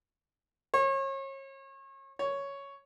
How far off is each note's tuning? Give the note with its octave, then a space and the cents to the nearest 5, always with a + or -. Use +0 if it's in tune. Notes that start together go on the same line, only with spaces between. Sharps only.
C#5 -35
C#5 +5